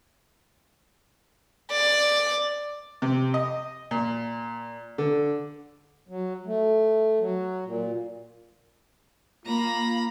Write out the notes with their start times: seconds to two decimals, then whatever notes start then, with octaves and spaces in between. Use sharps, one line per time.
1.71 D5
3.02 C3
3.34 D#5
3.91 A#2
4.98 D3
6.09 F#3
6.46 A3
7.20 F#3
7.65 A#2
9.45 A#3 F4 A#5 B5